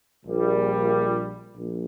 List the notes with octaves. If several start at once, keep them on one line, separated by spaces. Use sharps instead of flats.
A#1 A#2 G3
A#1 A#2